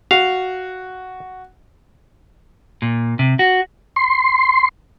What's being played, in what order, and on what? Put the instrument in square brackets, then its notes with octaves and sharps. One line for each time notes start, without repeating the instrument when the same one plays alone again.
[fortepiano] F#4 [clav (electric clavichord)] F5
[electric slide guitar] A#2
C3
F#4
[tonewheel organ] C6